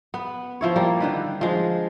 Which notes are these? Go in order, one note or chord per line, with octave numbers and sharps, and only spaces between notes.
B3
F3 E4 C#5
G3 A#3
D3 D#3 B4
F3 G#3